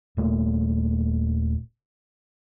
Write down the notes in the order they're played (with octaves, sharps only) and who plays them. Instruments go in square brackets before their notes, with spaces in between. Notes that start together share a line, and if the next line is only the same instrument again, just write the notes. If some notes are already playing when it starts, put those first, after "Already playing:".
[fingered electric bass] D#1 A#2 A3